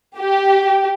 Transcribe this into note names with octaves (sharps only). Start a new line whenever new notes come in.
G4